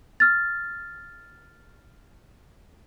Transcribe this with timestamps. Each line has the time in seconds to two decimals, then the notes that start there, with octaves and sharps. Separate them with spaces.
0.20 F6 A6